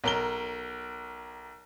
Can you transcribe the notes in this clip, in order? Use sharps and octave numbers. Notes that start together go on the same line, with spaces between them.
B1 A#4 G7